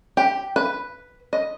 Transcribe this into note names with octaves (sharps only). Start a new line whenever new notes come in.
G4
B4
D#5